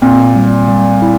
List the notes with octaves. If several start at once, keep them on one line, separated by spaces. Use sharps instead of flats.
A#2 C4
G3
G3
E4